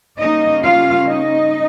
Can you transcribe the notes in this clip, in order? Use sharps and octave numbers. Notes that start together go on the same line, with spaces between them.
C#3 G3 A#3 C#4 D#4 D#5
F4 F5
D#4 D#5